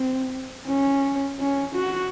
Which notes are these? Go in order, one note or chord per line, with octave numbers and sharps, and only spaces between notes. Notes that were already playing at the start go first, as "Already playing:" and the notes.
Already playing: C4
C#4
C#4
F#4